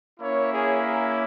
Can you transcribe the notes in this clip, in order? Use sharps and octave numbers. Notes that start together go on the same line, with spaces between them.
A#3 C#4 E4 C#5
G#4
A#4